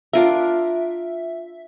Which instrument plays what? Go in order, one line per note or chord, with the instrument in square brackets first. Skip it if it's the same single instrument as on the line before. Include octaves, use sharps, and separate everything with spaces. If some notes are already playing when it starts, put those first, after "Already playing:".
[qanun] D4 F4 A#4 [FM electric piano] E5